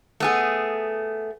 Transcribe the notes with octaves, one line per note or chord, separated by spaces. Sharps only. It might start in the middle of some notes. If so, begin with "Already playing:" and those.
A3 B3 G#4